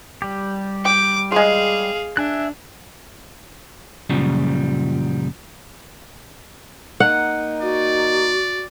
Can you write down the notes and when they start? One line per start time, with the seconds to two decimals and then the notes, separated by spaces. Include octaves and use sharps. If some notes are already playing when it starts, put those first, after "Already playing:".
0.22 G3 G4
0.85 G5 D6
1.32 G#3 F4 G#4 F5
2.17 D4 E5 G#5 F#6
4.10 F#2 A#2 C#3 F3 G3
7.00 A#3 D#4 F#5
7.62 F#4 D5